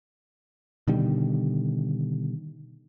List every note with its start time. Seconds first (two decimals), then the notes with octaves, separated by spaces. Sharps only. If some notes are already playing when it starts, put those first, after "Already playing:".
0.88 B2 D3 D#3 G3